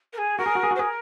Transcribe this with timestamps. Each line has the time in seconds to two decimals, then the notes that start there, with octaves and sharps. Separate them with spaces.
0.13 A#4
0.18 G#4
0.38 F#4 A#4
0.46 G#4
0.55 F#4
0.63 G#4
0.71 F#4
0.75 C5
0.79 G#4 A#4